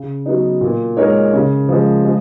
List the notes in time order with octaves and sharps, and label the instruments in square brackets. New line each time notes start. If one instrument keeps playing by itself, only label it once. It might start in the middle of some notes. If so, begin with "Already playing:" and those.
Already playing: [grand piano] C#3
F#3 B3 D#4
A#2
G#3 D#4 A#4 C#5
C#3
F3 G#3
G#3